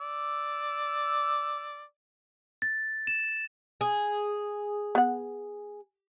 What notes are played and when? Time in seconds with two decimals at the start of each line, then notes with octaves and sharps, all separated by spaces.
0.01 D5 E6
2.62 A6
3.07 E7
3.81 G#4
4.95 B3 F#5